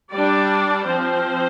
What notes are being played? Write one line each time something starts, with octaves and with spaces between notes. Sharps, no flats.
G3 D4 D5
F3 C4 C5